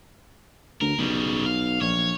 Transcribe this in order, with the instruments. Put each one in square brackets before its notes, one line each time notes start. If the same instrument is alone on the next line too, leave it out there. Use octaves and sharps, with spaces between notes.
[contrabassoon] D2 [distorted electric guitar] A#4
[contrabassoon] B1 [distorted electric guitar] C#3 G3
[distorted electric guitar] F5
[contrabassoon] A#1 [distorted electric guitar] C#5